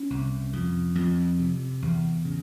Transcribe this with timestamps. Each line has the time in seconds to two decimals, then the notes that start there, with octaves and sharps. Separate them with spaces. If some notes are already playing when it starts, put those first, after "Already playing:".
Already playing: C#4
0.10 C2
0.53 F2
0.95 F2
1.39 C3
1.82 E2
2.25 C#3